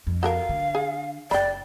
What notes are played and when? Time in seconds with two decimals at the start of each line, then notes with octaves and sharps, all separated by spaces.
0.07 F2
0.23 F#4 A4 A#4 F5
0.49 D3
0.75 G#4
1.31 F#1 D5 G5 B5